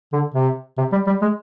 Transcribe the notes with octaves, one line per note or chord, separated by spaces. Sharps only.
D3
C3
C3
G3
G3
G#3